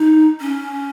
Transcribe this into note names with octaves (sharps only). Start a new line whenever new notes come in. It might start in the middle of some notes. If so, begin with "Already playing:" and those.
Already playing: D#4
C#4